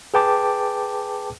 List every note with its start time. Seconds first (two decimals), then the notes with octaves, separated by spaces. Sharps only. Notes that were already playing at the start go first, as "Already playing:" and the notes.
0.14 G#4 B4 G5 A5 D6